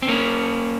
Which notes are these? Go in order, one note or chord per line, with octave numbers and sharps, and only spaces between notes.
C4
A#3 C#4